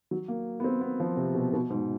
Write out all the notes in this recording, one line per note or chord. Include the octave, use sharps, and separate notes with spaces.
F#3
A#3
B3
C4
B3
F3
C3
B2
B2
G#2